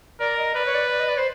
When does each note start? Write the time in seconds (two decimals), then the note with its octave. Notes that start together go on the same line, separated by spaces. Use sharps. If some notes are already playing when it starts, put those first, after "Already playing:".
0.20 A#4 D5
0.38 D#5
0.55 B4 D5
0.66 C#5
0.75 D5
0.91 D5
1.00 D#5
1.09 D5
1.18 C5